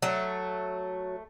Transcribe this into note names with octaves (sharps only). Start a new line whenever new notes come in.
F#3 A3